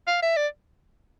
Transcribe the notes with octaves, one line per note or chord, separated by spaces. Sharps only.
F5
E5
D5